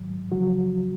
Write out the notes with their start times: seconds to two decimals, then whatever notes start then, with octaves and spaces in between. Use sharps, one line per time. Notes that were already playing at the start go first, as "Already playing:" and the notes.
Already playing: G#2 D#3 F#3
0.32 D2 C#3 F3 F#3 F#4